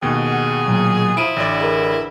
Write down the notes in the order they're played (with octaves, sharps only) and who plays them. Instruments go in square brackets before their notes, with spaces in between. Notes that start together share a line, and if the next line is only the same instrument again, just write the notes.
[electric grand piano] D#2 B2 [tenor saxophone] G#4
[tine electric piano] F#5
A#2 F#3
[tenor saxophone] F3 [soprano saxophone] E4 [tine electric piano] D#6 [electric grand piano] D7 D#7
[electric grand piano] A1 D5 [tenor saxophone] D3
[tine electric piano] G#4 A#4 B4